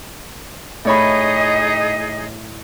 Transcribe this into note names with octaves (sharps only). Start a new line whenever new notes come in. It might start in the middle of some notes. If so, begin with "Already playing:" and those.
A2 D#4 G#4 C#5 D#5 B5